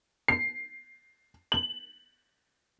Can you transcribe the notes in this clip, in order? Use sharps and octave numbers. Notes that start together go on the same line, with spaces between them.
C7
F#7